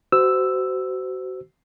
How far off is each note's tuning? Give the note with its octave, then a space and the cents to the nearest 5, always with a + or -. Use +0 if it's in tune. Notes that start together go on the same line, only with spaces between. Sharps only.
F#4 +30 C5 -25 E6 +0